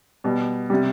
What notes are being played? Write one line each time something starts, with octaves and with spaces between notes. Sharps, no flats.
B2 G3
C3 G3